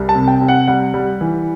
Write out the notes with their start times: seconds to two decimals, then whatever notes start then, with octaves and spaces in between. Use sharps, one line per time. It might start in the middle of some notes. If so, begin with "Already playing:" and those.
Already playing: C2 G3
0.09 A5
0.15 C3
0.28 G5
0.41 C3
0.48 F#5
0.68 G3 F#5
0.94 G3
1.21 E3